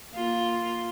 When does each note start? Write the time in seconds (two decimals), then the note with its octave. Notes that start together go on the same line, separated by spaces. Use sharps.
0.13 A#3 F4